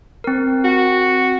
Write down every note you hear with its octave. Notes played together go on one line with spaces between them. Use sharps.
C4 A#4
F#4